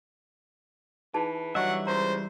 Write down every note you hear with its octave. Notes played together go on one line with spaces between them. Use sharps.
E3 D#4 G#4 A5
E3 F#3 G3 D4 D#5 E5 F#5 C#6
C#2 C5 A#5